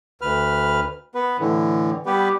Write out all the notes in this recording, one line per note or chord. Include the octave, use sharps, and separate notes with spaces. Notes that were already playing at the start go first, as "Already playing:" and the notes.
D2 B4 F6
B3 B4
A2 D3 E3
G3 B3 G4 B4